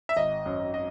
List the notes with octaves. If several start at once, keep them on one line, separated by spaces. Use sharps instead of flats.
E5
G#1 D#5
F#2
D#5